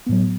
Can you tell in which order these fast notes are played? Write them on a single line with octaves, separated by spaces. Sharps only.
B3 A2 F#3